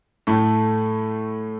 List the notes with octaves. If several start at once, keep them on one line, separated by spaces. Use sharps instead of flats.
A2 A3